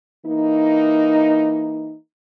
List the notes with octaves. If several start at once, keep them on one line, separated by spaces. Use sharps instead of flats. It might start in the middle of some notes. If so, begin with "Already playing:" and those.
E3 A#3 D#4